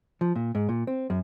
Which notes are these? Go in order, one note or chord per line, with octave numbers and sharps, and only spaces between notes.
F3
A#2
G#2
A#2
C4
F#2